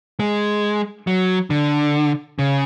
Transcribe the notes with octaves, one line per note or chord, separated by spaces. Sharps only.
G#3
F#3
D3
C#3